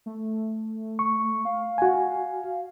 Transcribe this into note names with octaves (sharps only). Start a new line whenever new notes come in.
A3
C#6
F5
F#4 G#5